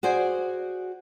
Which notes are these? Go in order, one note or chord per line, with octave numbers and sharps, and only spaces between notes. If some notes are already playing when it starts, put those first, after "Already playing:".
F#4 G#4 C5 D5 G#5